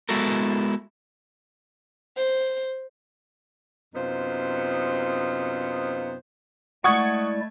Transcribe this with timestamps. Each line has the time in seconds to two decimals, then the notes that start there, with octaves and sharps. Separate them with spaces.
0.09 G#3 B3 E4 F#4 A4 A#4
2.16 C5
3.95 F#2 C3 B3 D#4 F4 C5
6.84 G#3 A3 E4 D5 F#5 C#6 D#6 G#6